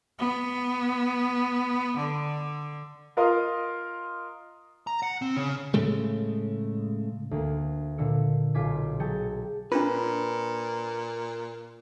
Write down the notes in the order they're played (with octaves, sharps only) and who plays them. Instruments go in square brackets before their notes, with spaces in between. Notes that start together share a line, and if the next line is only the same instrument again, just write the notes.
[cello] B3
D3
[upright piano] F4 A#4 D#5 F5 C6 D#6
[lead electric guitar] A#5
F#5
C4
C#3
[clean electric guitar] A2 C#3 G#3 A3
[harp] D2 A#3
A#2 D3 E6 C#7
B1 F4 G#5 D6 B6
F#3 G#4 G5 A5 C#7
[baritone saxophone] A#2 [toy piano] D4 F4 [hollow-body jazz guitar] B4